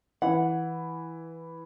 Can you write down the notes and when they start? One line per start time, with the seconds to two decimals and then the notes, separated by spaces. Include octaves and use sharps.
0.22 E3 F#5